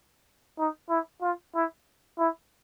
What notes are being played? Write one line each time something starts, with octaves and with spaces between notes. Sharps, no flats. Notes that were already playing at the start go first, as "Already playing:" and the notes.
D#4
E4
F4
E4
E4